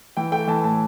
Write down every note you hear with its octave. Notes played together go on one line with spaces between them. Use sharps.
E3 G5
A3 G5
E3 A5
A2 A5